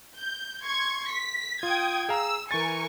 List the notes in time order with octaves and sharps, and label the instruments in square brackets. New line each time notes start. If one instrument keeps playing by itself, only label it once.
[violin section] G6
C6 C#6 G#6
B6
[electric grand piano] F4 [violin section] G5 D#6 G#6
[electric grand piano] G#4 F5 A#5 [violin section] E6
[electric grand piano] E3 A6 [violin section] A#4 G#5 C#6